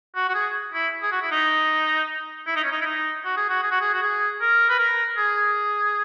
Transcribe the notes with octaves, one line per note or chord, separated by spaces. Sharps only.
F#4
F#4
G#4
E4
G#4
F#4
E4
D#4
E4
D#4
C#4
D#4
E4
D#4
F#4
G#4
F#4
G#4
F#4
G#4
F#4
G#4
A#4
B4
A#4
G#4